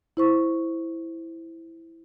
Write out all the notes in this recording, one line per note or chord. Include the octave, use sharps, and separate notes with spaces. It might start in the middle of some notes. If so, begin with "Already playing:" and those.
E4 C5 C#6